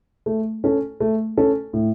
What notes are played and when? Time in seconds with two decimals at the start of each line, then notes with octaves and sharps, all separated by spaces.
0.26 A3
0.64 C#4 A4
1.00 A3
1.37 C#4 A4
1.73 A2